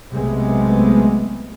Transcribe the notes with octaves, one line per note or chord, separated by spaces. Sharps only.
B1 C3 G#3 A3 B3